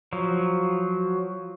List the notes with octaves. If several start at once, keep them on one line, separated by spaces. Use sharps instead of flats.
F3 F#3